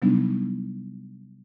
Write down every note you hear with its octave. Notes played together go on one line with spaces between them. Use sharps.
C3 F#3 G3 B3 D4 D#4